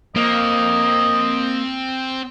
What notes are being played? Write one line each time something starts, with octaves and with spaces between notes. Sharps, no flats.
A#3 C4 D#5 F5